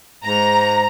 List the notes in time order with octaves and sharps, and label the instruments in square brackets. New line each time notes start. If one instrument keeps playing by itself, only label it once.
[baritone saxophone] G#2 [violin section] A#5